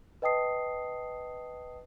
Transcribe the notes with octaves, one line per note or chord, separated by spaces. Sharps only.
B4 D#5 G5 A5 D#6 C7